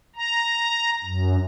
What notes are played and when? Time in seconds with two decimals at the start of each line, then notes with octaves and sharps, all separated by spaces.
0.16 A#5
1.04 F#2